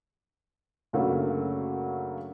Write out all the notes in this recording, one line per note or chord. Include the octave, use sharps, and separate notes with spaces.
F#2 C#3 F#3 A3 A#3 D4